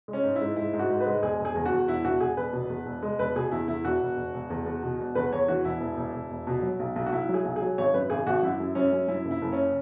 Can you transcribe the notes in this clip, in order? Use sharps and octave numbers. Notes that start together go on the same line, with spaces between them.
G#3
C#4
G#2
E4
G#2
G#2 E4
G#2
F#4
G#2
B4
G#3
E1 G#4
E1
G#4
E2
F#4
E2
E1 E4
E1 F#4
E1 G#4
E1 B4
B2
E2
E1
G#3
E1 B4
B2 G#4
E2 E4
E2 E4
E1 F#4
E1
E1
E1
E2
E2
B2
E1
E2 B4
E2 C#5
E3 F#4
E1 E4
E1
E1
E1
E1
B2
F#3
B1
B1
F#4
B1 E4
F#3
G#4
B1
G#4
F#3
G#1 C#5
F#2 B4
G#1 G#4
G#1 F#4
F#2 E4
F#2
F#2 C#4
F#2
F#2 E4
F#1
E4
F#1
C#4